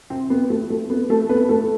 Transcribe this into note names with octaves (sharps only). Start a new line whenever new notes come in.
C3 C4
B3
A3
A3
B3
A3 A4
B3 B4
A3 A4